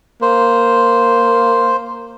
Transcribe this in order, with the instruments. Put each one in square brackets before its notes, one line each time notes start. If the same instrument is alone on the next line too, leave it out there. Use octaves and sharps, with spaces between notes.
[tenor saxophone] A#3 [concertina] C5